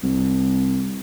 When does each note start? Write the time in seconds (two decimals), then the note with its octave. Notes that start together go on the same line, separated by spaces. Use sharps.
0.03 C2